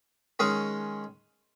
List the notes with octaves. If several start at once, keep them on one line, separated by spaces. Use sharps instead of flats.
D#3 G#3 C#4 G#4 C#5